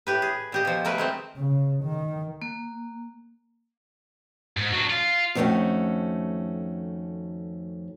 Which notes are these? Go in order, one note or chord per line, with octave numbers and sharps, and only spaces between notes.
A2 G4 B4
G#4
A#2 G4 D#5
B2 F3
F#3 A3 A#4 B4
G#3 A3 C4
C#3
D#3
A#3
G#2
F#3 D4
F4
F2 D#3 A3 C4 C#4 F#4